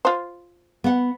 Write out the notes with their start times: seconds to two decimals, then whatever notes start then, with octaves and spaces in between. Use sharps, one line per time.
0.05 F4 C5
0.84 B3 F#5